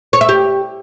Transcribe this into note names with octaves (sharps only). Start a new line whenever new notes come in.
C#5
E5
G4